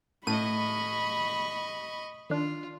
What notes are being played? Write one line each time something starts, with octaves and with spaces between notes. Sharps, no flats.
A2 D#5 B5 C#6 D#7
D#3 D4 F4